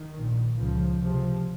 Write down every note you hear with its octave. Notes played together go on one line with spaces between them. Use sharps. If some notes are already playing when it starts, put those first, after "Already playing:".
Already playing: D#3
A#1 A#2
C#2 C#3 F3
C#2 C3 F3